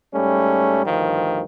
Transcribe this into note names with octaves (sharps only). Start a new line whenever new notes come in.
G#2 G3 A3 C#4
D2 G2 D#3 F3